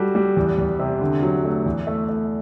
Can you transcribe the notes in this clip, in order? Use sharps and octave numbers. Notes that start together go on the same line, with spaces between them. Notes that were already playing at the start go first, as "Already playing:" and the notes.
Already playing: G3 F#4 A4
G3
E2
E2
C3
D3
F#3
A3
E2
A3
A3